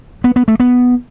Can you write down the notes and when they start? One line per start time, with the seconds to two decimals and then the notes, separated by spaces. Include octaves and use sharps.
0.24 B3
0.36 B3
0.48 A3
0.60 B3